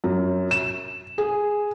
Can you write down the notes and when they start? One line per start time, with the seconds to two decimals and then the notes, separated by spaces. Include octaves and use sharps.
0.04 F#2
0.51 E7
1.18 G#4